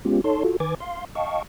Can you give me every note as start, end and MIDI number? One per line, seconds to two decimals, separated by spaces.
0.05 0.21 56
0.05 0.21 59
0.05 0.21 61
0.05 0.21 65
0.05 0.21 67
0.24 0.43 63
0.24 0.43 69
0.24 0.43 73
0.24 0.43 81
0.24 0.43 84
0.44 0.56 65
0.44 0.56 66
0.44 0.56 69
0.60 0.75 51
0.60 0.75 71
0.60 0.75 80
0.60 0.75 86
0.60 0.75 92
0.60 0.75 93
0.80 1.05 77
0.80 1.05 84
1.15 1.42 75
1.15 1.42 77
1.15 1.42 79
1.15 1.42 81
1.15 1.42 85